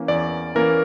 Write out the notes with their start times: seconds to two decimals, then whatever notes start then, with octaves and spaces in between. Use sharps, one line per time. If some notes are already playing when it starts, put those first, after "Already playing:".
Already playing: E3 A#3 C#4
0.08 E2 D5
0.55 E3 A#3 C#4 A#4